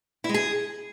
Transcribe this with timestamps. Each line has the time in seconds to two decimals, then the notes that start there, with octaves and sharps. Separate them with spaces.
0.24 E4
0.29 G#3
0.34 G#4